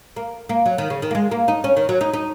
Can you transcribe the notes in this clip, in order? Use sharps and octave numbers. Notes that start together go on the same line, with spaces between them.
A#3
A#3
F#3
D#3
C#3
D#3
A#3
G#3
A#3
D#4
C#4
D#3
F#3
D#4
D#4